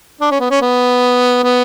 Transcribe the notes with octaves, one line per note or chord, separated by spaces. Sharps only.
D4
C#4
B3
C#4
B3
B3